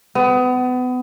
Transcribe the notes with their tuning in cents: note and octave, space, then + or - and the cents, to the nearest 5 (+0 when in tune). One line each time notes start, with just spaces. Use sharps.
B3 +30